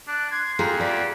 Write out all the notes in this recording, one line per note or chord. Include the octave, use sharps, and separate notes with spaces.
D4 F#6
C6 G#6
F2 G#4 A#5
B3 G4 D5 E5